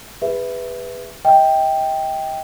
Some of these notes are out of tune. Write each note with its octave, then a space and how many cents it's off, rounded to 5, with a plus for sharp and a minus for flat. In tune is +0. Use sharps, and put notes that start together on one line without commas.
G#4 -35 B4 +0 E5 +0
D#5 +40 G5 +0